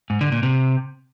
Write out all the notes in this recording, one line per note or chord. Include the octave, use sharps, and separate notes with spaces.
G#2
D3
A#2
C3